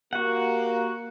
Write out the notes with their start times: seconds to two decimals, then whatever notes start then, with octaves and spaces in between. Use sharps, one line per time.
0.13 A#3 F#4 G4 F#5